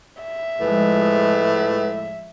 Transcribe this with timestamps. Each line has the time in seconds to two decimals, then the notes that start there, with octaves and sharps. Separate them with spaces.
0.22 E5
0.60 A2 F3 G#3 B4